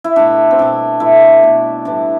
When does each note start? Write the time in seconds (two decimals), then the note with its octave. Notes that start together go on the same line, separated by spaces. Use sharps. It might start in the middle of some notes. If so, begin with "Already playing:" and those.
0.04 E4
0.16 B2 A3 D4
0.51 C4
0.58 B2 A3 D4
1.00 B2 A3 E4
1.43 B2 A3
1.85 A2 E3 G3 D4